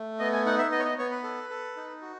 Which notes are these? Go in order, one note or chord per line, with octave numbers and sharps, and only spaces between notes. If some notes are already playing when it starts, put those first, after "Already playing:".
Already playing: A3
B3 D#5
G#5
D#4 F#5
E5
B3 D#5
C#5
D#5
B3 C#5
B4
A4
A4
D#4
F#4